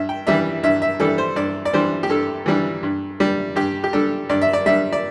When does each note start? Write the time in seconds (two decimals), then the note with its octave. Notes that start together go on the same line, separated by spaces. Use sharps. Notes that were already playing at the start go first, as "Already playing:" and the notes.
Already playing: G2 E5
0.09 G5
0.27 E3 G3 D4 E5
0.63 G2 E5
0.82 E5
1.00 E3 G3 D4 A4
1.18 C5
1.36 G2 D5
1.65 D5
1.73 E3 G3 D4 C5
2.03 G4
2.09 G2 A4
2.46 E3 G3 D4
2.83 G2
3.20 G3 D4
3.56 G2 G4
3.84 G4
3.93 G3 D4 A4
4.29 G2 D5
4.41 E5
4.53 D5
4.66 G3 D4 E5
4.92 D5